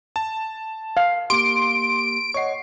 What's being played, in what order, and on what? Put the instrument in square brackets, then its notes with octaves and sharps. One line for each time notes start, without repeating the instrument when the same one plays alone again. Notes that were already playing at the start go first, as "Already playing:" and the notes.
[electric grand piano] A5
[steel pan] F5
[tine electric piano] A#3 G4 [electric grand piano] C6 D6 [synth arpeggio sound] D7
[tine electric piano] C#5 D#5 F#5 [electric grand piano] C#6 C7